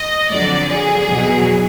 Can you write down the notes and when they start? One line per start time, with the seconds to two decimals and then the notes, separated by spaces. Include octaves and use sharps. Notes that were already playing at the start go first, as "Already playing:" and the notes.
Already playing: D#5
0.30 F2 D3 F#3 D5
0.69 G#4
1.08 E2 B2 F#3